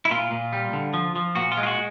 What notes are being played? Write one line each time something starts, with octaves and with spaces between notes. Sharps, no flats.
E4
A#2 F4
A#2
G3
D3
F3
F3
A#2 F#4
F4
G#3
F4
F#4